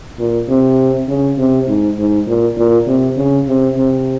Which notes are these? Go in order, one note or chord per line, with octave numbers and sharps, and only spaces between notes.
A#2
C3
C#3
C3
G#2
G#2
A#2
A#2
C3
C#3
C3
C3